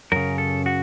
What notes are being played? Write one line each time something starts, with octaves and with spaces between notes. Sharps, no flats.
F#2 C#3 A#4
A4
F#4